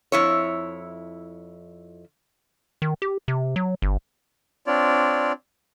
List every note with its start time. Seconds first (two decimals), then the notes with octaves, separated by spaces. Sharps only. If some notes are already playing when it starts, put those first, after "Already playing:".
0.12 F2 E4 C#5
2.82 D#3
3.02 G4
3.28 C3
3.56 F#3
3.82 G1
4.66 C4 D4 F4 C#5 D5